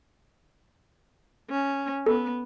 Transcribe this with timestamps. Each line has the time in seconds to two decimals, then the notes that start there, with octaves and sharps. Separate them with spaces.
1.50 C#4
2.06 B3 A4